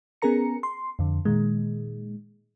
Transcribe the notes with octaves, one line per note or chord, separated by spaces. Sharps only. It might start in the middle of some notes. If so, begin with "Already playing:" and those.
B3 C#4 G#4 A#4 A#5 C#7
C6
F2 D3
A#2 D#3 G#3